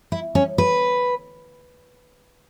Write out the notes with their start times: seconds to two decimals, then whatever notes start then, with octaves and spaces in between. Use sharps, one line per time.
0.12 E4
0.35 C#4
0.58 B4